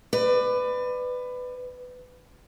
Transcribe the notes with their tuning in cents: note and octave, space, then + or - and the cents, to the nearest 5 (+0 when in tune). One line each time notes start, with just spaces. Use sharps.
B4 +20 D5 +30